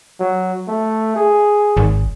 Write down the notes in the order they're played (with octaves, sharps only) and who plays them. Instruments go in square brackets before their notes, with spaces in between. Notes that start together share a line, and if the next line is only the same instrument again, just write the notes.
[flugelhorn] F#3
A3
G#4
[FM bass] G#1